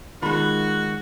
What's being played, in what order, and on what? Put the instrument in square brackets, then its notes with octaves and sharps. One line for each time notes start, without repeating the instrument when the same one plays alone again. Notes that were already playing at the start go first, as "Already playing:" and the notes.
[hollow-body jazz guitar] D#3 G#3 [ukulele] F4 B5 [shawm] F#4